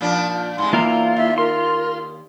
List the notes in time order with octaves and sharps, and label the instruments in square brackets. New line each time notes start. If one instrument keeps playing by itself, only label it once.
[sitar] A#2 F3 D4 [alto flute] A5
[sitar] G#2 C3 G#3 [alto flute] C6
[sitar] E2 [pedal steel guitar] A#3 E4 F5 [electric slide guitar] F4 [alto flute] A#5
[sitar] D#2 [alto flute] E5
[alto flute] A#4 [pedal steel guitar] C6